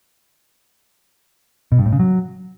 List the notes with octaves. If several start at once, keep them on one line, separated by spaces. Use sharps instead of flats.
B2
G2
A2
C#3
F#3